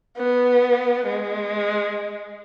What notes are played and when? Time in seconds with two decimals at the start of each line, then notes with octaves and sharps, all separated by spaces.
0.18 B3
1.07 G#3